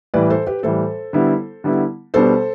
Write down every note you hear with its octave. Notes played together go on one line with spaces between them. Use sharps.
A2 E3 G3 B4 D5
A4 C5
G4 B4
A2 E3 G3 A4 C5
D3 G3 B3 E4
D3 G3 B3 E4
B2 G3 B3 D4 A4 C5